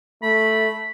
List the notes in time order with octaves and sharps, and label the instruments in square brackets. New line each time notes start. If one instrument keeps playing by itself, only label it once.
[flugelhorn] A3 [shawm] B5